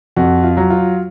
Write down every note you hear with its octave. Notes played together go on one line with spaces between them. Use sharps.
F2 F#4
F4
F#3
F4